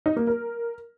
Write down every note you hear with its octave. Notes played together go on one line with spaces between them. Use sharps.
D#4
A#3
A#4